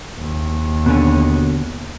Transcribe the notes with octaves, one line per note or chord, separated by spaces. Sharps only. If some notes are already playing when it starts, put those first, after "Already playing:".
D#2
B2 D3 C#4